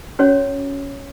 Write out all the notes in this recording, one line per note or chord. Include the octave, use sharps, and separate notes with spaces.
C#4 F#4 C#5